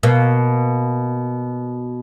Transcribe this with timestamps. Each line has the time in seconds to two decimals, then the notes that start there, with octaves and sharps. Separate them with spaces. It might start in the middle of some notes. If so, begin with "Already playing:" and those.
0.03 B2 A#3